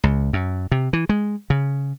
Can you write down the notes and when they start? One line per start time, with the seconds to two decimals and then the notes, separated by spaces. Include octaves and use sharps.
0.04 C#2
0.33 F#2
0.71 C3
0.93 E3
1.09 G#3
1.50 C#3